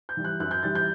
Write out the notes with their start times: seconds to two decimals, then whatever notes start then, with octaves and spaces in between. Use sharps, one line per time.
0.09 G6
0.17 E3 G3
0.25 F#6
0.40 F#2 F#6
0.51 G6
0.63 E3 G3 A6
0.75 G6